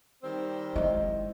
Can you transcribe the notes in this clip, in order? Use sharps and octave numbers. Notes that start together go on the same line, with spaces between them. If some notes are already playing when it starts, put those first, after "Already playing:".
D#3 G3 C4
G#3 E4 D#5